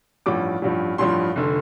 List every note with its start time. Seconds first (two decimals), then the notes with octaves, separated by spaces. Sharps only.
0.26 A1 G2 F3 D6
0.62 A1 G2 F3
0.98 A1 G2 F3 C6
1.36 F1 D3